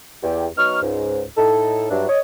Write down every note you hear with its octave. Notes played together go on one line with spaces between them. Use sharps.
E2 G4
F#3 B3 D#4 C#6 F6
C#2 G#2
A2 D#4 A4
G2 F#3 D4 E4
C#5 D#5